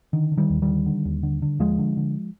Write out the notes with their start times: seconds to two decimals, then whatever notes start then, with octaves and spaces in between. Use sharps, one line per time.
0.13 D3 D#3
0.32 D3
0.37 D#3 G3
0.50 D#2
0.62 D#3 G3
0.68 D3
0.86 D3
1.05 D#2
1.23 D3
1.42 D3
1.59 D#2 F3 G#3
1.79 D3
1.97 D3